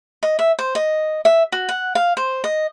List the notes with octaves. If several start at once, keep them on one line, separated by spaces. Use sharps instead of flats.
D#5
E5
C5
D#5
E5
F#4
F#5
F5
C5
D#5